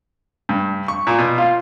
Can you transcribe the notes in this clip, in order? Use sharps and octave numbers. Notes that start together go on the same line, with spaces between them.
G2
C#6
A#2
B2
F4